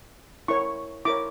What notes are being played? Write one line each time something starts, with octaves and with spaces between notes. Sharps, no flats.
E4 A#4 C#5 C#6
E4 A#4 C#5 D6